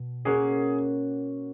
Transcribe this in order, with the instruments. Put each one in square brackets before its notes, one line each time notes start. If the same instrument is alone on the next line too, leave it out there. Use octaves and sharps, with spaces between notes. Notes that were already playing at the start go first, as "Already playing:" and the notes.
Already playing: [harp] B2
[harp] A#3 C#4 F#4 [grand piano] G#4